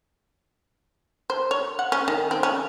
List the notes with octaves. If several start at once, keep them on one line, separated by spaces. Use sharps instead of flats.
C5
C#5
F#5
C#4
D#3
C4
C#4